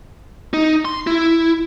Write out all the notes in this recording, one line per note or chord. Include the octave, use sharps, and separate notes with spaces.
D#4
C6
E4